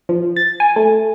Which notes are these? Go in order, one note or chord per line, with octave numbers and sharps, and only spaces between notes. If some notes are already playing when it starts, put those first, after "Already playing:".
F3
A6
G#5
A3